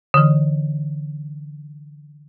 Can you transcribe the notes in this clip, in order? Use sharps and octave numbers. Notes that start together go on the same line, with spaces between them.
D3 E3